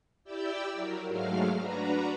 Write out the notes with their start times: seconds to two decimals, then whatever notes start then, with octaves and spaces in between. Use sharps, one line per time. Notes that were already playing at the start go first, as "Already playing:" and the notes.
0.24 E4 G4 D5 G5 E6
0.73 F#3 A#4
1.07 G#2 F#3 G#3 A3 F5 F6
1.55 D4 F#4 B4 A#5